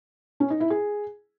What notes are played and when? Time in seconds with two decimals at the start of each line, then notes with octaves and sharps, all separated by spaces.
0.40 C#4
0.50 D#4
0.60 E4
0.70 G#4